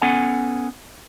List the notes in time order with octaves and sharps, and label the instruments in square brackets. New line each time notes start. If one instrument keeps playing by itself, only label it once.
[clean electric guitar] B3 C#4 A4 F#5 G#5